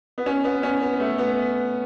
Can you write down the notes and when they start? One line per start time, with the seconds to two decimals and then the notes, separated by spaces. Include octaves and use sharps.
0.18 B3
0.26 C#4
0.44 B3
0.63 C#4
0.82 B3
1.00 A3
1.18 B3